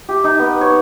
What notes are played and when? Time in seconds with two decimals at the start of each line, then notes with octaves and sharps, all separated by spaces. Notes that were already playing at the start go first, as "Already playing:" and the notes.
0.09 G4
0.24 D#4
0.39 B3
0.61 C#5